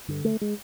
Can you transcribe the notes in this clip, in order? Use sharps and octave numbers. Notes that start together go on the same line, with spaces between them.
G2 D3
A3
G#3